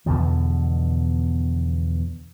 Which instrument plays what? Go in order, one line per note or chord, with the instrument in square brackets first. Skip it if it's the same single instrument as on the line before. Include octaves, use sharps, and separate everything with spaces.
[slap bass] E2 B2 D3 F3